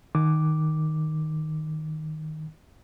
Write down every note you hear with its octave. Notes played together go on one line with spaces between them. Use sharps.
D#3 D6